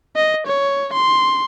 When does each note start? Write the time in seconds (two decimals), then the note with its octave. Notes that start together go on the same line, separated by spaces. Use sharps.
0.16 D#5
0.47 C#5
0.93 C6